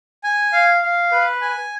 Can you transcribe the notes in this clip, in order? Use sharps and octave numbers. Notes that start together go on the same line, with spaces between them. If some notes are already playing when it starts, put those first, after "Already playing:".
G#5
F5
F5
B4
G#5